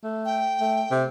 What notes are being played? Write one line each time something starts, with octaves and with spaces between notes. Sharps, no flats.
A3
G5
A3
C3